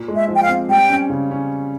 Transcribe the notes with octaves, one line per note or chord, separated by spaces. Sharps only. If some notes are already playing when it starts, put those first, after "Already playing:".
Already playing: A#2
G#3
E5
F3
G5
F5
C4
G3 G5
C#4
C#3
C#4